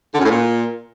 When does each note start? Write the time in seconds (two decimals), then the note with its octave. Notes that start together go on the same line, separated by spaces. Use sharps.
0.12 D3
0.18 F#2
0.23 A2
0.28 A#2